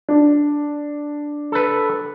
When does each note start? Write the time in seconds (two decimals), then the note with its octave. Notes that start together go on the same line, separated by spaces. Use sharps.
0.09 D4
1.52 A4 B4